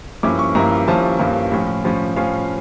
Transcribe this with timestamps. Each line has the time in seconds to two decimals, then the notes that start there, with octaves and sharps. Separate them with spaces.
0.23 G2 F3 A#3 C#4 E4 D6
0.39 C#6
0.55 G2 F3 A#3 C#4 E4 A#5
0.88 G2 F3 A#3 C#4 E4 A5
1.19 G2 F3 A#3 C#4 E4
1.52 A2 F3 C#4
1.84 A2 F3 C#4
2.16 A2 F3 C#4 F5